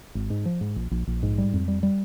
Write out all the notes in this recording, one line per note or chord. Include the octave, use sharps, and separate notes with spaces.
G#1
G#2
F3
G#2
A#1
A#1
A#1
G#2
G3
F2
G3
G3